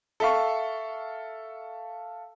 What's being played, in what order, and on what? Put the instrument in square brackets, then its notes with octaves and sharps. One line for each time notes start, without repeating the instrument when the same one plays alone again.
[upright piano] A4 E5 F5 C#6